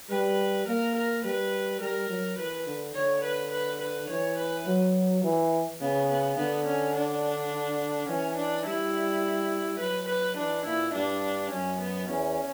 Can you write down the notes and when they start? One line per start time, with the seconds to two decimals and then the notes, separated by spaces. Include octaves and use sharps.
0.10 G3 B4
0.67 A#3 A#4
0.96 A#4
1.25 G3 B4
1.81 G3 A#4
2.10 F#3
2.38 E3 B4
2.66 D3
2.95 D3 C#5
3.24 B4
3.52 B4
3.82 B4
4.09 E3 C#5
4.38 B4
4.67 F#3
5.24 E3
5.81 C#3 B3
6.09 B3
6.38 D3 B3
6.66 C#4
6.96 D4
8.09 E3 C#4
8.38 D4
8.66 G3 E4
9.80 F#3 B4
10.09 B4
10.37 E3 D4
10.66 A#2 E4
10.94 G2 D4
11.52 F#2 C#4
11.80 B3
12.09 E2 C#4